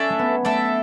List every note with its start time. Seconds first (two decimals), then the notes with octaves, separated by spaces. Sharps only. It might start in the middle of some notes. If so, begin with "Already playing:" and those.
Already playing: C#4 D4 A4 E5
0.10 A3
0.19 B3
0.45 A3 D4 A4 E5